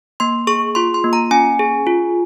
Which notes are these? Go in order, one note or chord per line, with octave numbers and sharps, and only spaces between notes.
A#3 C6
G#4 C#6
F4 C6
C6
A#3
A#5
C#4 G#5
G#4
F4